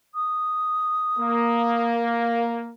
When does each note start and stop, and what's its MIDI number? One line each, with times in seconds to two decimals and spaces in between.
0.15 1.85 87
1.18 2.71 58